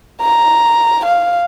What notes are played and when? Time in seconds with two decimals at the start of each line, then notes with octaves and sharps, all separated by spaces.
0.22 A#5
1.06 F5